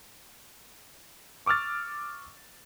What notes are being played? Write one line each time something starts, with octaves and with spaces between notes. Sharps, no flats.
C#6 D6 E6 F6 A6